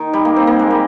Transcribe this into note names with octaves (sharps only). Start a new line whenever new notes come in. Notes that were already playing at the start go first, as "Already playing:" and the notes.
Already playing: D#3 D#4
G3
A#3
C4
A#3
G#3
G3